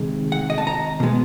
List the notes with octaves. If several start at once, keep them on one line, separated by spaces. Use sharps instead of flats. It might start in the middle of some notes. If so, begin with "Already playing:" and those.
Already playing: C3 D#3 G#3
F#5
D#5
A5
A#5
B2 G#3 B3